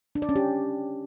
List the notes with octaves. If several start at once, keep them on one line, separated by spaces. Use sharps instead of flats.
D4
D5
C#4
G4